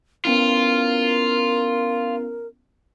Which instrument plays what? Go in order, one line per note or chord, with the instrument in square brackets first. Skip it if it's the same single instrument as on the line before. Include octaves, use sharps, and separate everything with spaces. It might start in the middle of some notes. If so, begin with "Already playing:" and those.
[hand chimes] B3 C#4 E4 [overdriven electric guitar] F4 [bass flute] A#4